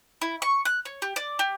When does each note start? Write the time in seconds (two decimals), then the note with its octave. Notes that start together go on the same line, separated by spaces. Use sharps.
0.22 E4
0.42 C#6
0.65 F#6
0.85 C#5
1.02 G4
1.16 D5
1.39 G4